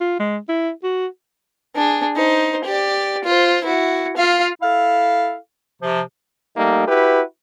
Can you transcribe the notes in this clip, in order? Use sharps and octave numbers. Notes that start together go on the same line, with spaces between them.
F4
G#3
E4
F#4
D4 G#4
D#4 C5
G4 D5
F4 C5
E4 F#4
F4 F5
E4 A4 F5
C3 F3
G3 A3 A#3 D#4
E4 F#4 G4 B4